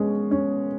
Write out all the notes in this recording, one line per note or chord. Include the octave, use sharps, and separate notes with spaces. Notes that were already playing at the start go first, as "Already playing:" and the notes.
Already playing: B2 G#3 C#4
C#4